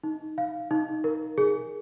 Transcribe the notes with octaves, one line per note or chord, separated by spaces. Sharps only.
D#4
F5
D#4
A#4
G#4